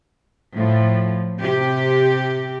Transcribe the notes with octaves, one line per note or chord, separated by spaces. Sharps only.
A2 F3
C3 G4